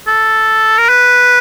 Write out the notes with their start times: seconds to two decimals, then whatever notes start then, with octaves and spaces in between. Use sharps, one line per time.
0.08 A4
0.78 A#4
0.89 B4